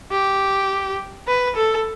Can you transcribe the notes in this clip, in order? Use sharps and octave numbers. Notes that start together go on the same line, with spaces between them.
G4
B4
A4